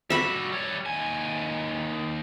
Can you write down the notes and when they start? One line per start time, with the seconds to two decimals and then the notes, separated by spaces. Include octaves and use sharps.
0.10 G3 F#4 E5 B5
0.52 G3 C#5
0.86 D#2 G#5